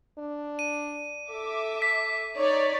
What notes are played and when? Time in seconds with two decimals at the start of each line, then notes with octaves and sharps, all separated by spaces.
0.18 D4
0.59 D#7
1.31 A4 E5 D6
1.82 B6
2.37 D#4 C#5 D5